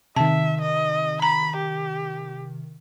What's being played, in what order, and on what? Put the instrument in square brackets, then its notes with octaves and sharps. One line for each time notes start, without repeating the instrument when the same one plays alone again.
[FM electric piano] C3 D#3 [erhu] E5 [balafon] A5
[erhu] D#5
[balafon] A#5 [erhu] B5
[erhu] G4